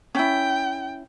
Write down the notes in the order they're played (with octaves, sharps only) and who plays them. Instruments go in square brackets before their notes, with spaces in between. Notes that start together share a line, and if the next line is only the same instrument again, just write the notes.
[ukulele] C#4 E4 [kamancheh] G5